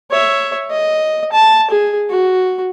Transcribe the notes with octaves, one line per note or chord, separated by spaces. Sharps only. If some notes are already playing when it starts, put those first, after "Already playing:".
C#5 E5
D#5
A5
G#4
F#4